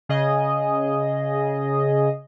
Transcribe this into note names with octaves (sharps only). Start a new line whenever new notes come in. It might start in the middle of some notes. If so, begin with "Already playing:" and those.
C#3 G#4 D#5